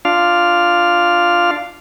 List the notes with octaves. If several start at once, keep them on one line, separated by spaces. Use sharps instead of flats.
D4 F4 F5